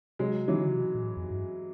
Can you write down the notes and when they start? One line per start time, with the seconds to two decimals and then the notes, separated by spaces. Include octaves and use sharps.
0.19 C3 F#3 G#3
0.48 D#3 E3 F#3
0.58 D3
0.67 C#3
0.76 C3
0.95 A#2
1.03 A2
1.17 F2
1.31 G2